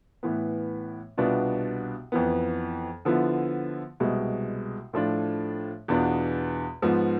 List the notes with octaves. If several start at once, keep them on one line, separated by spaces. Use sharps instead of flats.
A2 E3 B3
C2 B2 B3 D4 F4
F2 E3 B3
D3 F3 B3 E4
C2 B2 G#3
A2 F3 A3 D4 F4
E2 B2 B3 D4 F4
G#2 F3 B3